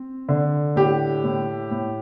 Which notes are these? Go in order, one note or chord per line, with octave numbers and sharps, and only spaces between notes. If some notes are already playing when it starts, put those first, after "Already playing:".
Already playing: C4
D3
A2 G4
A2
A2